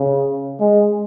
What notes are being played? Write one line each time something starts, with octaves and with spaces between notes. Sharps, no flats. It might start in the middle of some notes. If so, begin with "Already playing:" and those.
Already playing: C#3
G#3